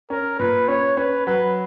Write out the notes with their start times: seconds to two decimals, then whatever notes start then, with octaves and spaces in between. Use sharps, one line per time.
0.10 C#4 A#4
0.39 A#2 B4
0.68 C#4 C#5
0.97 C#4 B4
1.27 F#3 B4